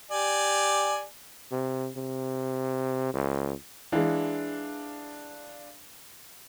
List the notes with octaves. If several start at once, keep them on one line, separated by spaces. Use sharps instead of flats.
G4 D5 G#5
C3
C3
C#2
E3 G#3 D4 F5